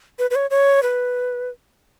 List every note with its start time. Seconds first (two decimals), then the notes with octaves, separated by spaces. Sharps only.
0.19 B4
0.31 B4
0.35 C#5
0.50 C#5
0.83 B4